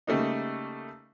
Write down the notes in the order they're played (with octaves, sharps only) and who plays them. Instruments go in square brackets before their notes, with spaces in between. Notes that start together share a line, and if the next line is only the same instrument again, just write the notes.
[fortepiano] C#3 G3 A3 A#3 D#4